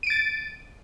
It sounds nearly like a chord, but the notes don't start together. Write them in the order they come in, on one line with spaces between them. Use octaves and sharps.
D#7 D7 A6